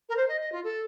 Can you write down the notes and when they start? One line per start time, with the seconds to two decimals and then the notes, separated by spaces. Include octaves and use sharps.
0.09 A#4
0.17 C5
0.28 D#5
0.41 D#5
0.52 F4
0.64 A4